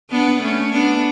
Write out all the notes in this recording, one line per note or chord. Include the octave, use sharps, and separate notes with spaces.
B3 D4
A3 C#4
B3 D4